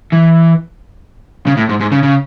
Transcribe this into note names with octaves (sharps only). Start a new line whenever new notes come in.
E3
C#3
A2
G#2
G#2
C#3
C#3